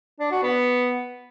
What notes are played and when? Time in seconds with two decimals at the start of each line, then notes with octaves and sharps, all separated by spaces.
0.20 D4
0.31 F#4
0.42 B3